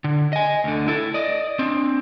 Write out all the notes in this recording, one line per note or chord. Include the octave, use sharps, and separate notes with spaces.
D3
D#5 G#5
D2 D3
E4 A4
D5 D#5
C4 D4